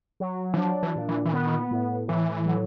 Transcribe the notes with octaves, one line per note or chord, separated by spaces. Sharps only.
F#3
E3
F3 D4
E3
A#2
E3
E3
D#3 B3
A2
A2 E3
F#3